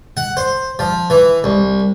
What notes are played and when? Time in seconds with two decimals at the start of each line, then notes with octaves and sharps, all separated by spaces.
0.17 F#5
0.37 C5
0.79 F3
1.10 E3
1.44 C2